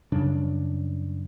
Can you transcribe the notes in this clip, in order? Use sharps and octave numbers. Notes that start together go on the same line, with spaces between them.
F#2 C#3 G3 D4